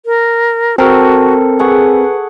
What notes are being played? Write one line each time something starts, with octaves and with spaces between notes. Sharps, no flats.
A#4
C4 F#4 A4 A#4
G#4 B4 F#5 C#6